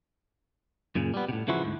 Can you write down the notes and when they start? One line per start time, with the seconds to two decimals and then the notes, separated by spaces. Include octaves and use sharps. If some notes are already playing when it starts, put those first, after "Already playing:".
0.95 F#2 A#2 C#3
1.14 G3 B3
1.29 A2 C3
1.48 C#3 E3 F3 E4 F#4
1.64 D2 G#2